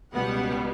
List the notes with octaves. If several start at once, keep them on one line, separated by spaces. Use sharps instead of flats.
C#2 B2 G3 B3 F#5